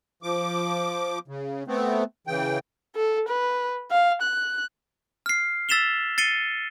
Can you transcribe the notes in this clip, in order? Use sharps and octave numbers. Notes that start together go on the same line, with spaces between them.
F3 D6
C#3
A3 B3 C4
C#3 E3 G5
A4
B4
F5
F#6
F6 C7
E6 A6 B6 E7 F7 G7
A6 C7 C#7 D#7 G7